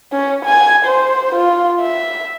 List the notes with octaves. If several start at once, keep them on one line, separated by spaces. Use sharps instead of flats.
C#4
G#5
C5
F4
E5